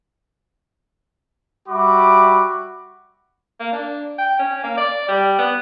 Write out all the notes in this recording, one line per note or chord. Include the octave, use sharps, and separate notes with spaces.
G3 F#4 E5 B5 D6
A#3
D4
G5
C#4
A#3
D5
G3
B3